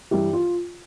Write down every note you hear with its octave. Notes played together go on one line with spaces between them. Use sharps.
G2 E3 E4 G4
F4